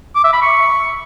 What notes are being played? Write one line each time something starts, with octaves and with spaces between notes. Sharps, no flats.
D6
E5
B5
C#6